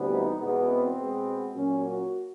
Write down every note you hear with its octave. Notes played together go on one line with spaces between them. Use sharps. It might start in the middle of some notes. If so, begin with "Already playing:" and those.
Already playing: D2 C3 E3 G3 B3
D#4
E2 B2 G#3 B3
C4
B2 G#3 B3
A#2 F#3 A#3 C#4
F#4